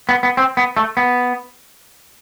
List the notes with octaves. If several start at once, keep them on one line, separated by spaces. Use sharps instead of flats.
B3
B3
C4
B3
A3
B3